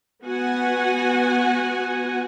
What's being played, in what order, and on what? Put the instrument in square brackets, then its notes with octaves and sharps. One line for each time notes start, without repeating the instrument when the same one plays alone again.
[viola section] B3 F#4 F#5 G#5